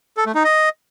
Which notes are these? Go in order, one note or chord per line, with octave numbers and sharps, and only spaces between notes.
A4
A3
D#4
D#5